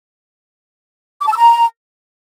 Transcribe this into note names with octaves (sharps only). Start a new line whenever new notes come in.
D6
A5
E6
A#5